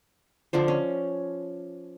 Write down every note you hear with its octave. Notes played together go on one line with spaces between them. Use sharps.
D3 F3 D4 C5
C#4